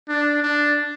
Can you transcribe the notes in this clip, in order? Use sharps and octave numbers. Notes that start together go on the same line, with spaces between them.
D4
D4